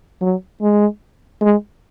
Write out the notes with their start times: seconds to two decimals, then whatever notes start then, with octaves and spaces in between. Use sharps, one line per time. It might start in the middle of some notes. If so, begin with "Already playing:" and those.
0.21 F#3
0.62 G#3
1.42 G#3